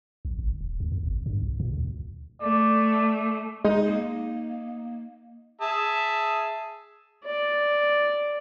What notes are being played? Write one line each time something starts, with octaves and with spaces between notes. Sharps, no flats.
A#1
G1
D#1
D2
E2
G1
G2
B1
A#2
D2
A3 D5
G#3 D#4
A#3
G#4 E5 A5
D5